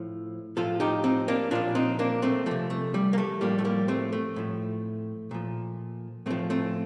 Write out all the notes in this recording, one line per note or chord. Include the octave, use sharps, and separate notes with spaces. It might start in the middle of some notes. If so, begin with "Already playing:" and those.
Already playing: A2 F3
A2 F3 F4 A4
D#4 G4
C4 D#4
A#3 D4
A#2 F3 D4 F4
C4 D#4
A#3 D4
A3 C4
C3 F3 A3
A3
G3
A#3
A3
A2 F3 G3 A#3
A3
G3 A#3
A3 C4
A3
A2 F3
A#2 F3
A2 F3 A3 C4
A3 C4